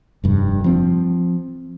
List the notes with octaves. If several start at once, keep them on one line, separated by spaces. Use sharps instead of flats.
F1 G2
F3 C4